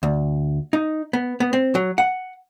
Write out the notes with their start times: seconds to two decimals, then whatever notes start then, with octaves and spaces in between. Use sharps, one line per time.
0.03 D2
0.73 D#4
1.13 B3
1.40 B3
1.53 C4
1.75 F#3
1.98 F#5